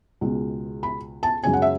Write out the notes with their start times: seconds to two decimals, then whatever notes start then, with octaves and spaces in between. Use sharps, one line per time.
0.21 C#2 B2 G#3
0.83 B5
1.23 A5
1.44 F#2 C#3 G#3 C#4 G#5
1.53 F#5
1.62 E5